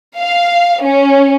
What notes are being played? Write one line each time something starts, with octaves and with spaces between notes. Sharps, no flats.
F5
C#4